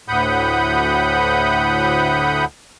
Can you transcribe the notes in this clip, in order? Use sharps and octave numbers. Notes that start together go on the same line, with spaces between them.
D2 A2 F#5 B5 D#6 G6